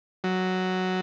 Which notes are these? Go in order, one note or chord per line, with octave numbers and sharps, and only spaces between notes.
F#3